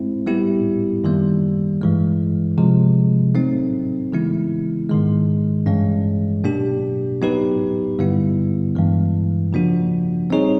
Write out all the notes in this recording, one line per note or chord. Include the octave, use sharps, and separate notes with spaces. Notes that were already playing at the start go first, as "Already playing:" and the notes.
Already playing: G#3 C4 E4
G3 B3 E4 G4
F#2 D#3 G3 A#3
G2 E3 G#3
C3 F3 G#3
F#3 A3 C4 D#4
C#3 E3 G#3 B3 E4
G#2 D#3 G#3
G2 E3 G#3 C#4
B2 F#3 A#3 D4 G4
F#3 B3 D#4 G4 B4
G2 D3 G3 B3 E4
G2 E3 G#3
C#3 F3 A#3 D4 F#4
G3 C4 D#4 G#4 C#5